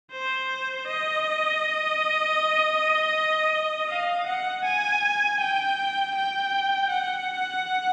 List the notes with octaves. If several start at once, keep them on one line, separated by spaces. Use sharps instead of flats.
C5
D#5
F5
F#5
G#5
G5
G5
F#5